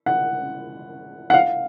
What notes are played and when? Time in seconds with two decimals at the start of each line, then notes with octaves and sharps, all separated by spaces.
0.06 F#5
1.30 F#5
1.34 F5